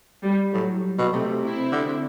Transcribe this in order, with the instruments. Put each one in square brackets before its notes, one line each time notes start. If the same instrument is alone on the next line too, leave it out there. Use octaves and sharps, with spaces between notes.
[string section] G3
[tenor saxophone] A2 [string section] F#3
[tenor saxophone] B2
[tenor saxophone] C3 [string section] A3 C4
[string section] C4 E4
[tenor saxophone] D3
D3